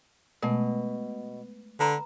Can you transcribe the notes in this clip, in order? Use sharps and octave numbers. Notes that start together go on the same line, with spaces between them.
B2 G#3 A3 A#4
D3 B4 A#5 B5